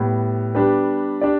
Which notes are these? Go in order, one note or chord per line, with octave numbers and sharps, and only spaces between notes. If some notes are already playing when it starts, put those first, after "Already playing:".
Already playing: A2 G3 B3
G3 B3 D4 G4 B4
D4 G4 D5